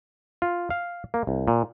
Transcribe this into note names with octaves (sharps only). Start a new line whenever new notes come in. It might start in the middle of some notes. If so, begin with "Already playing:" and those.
F4
F5
A#3
C2
A#2